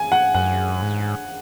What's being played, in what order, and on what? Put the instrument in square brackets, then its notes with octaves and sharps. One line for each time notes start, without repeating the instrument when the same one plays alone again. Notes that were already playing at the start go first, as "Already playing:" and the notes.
Already playing: [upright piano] G#5
F#5
[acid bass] F#2 [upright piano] F#5
[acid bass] G#2